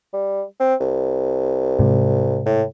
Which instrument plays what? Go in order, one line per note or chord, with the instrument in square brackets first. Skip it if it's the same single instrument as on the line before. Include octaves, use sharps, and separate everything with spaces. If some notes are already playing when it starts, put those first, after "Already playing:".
[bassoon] G3
C4
C2
[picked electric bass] G#2 C3
[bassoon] A2